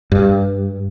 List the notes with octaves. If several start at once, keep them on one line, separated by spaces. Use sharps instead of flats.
G2